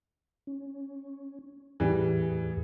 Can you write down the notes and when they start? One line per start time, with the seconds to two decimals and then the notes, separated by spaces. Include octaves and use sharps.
0.47 C#4
1.80 E2 A2 E3 G3 G#4